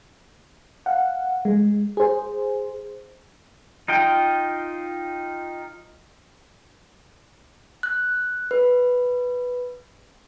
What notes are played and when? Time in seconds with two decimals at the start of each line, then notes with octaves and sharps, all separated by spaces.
0.86 F5 F#5
1.45 G#3
1.97 G#4 C5
3.88 D#4 F4 G5
7.83 F#6
8.51 B4